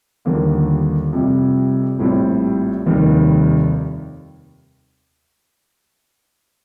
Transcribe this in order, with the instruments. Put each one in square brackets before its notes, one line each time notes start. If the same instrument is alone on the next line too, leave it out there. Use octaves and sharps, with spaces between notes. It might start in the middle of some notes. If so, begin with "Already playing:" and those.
[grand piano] D#2 D3 G3 A#3 F4
F2 C3 G3
A#1 A2 G3 C4
F1 D#2 D#3 G3